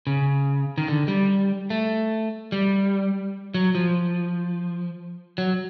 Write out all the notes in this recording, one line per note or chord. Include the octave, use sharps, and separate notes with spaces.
C#3
D#3
D3
G3
A3
G3
F#3
F3
F#3